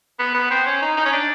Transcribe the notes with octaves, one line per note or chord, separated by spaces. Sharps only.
B3
B3
C4
C#4
D#4
D#4
C#4
D4